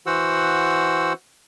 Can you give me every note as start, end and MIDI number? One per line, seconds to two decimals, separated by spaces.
0.06 1.13 52
0.06 1.13 66
0.06 1.13 72
0.06 1.13 78
0.06 1.13 88